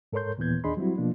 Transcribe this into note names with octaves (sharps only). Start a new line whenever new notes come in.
G#2 A4 A#4 C#5 C6 G6
D#2 A#2 E3 B3 G6 G#6
D#2 D4 G#4 D#5 B5 C6
F#3 G3 C4 E4 F#4
B2 F3 A#3 D4 F4